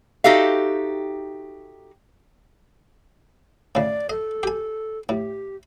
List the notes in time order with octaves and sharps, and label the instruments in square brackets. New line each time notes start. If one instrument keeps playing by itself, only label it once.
[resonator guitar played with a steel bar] D#4 F#4 G4 A4 E5 F5
[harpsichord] A2 C#3 [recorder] D5
[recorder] A4 [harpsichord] D#5
[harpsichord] G4 G#5
[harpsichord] A2 [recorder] G4